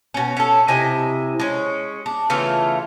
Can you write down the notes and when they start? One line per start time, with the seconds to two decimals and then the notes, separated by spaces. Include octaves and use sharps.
0.14 B2 C#4
0.37 C#4 A4
0.68 C3 E4 D#5 G#5
1.40 G#3 C#4
2.06 D4
2.30 C#3 E3 A3 F4